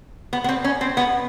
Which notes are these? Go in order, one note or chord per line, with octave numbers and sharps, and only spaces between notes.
B3
B3
C4
C#4
C4
B3